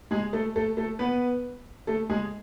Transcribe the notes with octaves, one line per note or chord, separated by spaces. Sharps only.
G#3 G#4
A3 A4
A3 A4
A3 A4
B3 B4
A3 A4
G#3 G#4